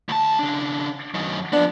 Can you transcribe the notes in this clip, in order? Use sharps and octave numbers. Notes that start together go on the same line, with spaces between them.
D2 A5
C#3 D4
F#2 D#3
F3 B3 D4